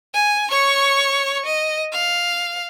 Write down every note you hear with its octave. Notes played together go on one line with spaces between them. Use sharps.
G#5
C#5 C#6
D#5
F5